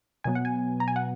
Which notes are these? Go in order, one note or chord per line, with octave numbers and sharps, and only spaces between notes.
B2 F#3 B3 G#5
F#5
G#5
A#5
G#5
F#5